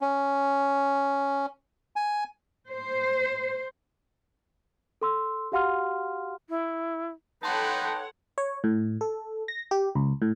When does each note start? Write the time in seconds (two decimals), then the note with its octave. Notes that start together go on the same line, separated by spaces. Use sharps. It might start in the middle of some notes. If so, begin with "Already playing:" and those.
0.01 C#4
1.96 G#5
2.71 C5
5.02 A4 C6 E6
5.52 F#4 G4 F5 F#5 C6 F6
6.49 E4
7.43 D#4 A4 B4 C#5 F#5 G5 A5 C6
8.38 C#5
8.64 A2
9.01 A4
9.48 A#6
9.71 G4
9.95 C#2
10.22 A2